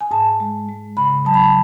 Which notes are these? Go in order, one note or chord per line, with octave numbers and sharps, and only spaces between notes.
G#5
G#2 A5
G#3
G#3
C#3 B5
F#3 A5
B5
A5